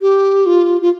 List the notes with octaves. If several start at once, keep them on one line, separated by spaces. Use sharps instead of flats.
G4
F4
F4